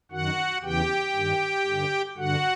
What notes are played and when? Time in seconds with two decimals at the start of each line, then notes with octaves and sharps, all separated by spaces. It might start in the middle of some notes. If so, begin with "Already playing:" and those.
0.12 F#2 D#3 F#4 F#5
0.63 E2 C#3 E3 G4 G5
1.14 G2 D#3
1.66 G2 D3
2.17 G2 D3 F#4 F#5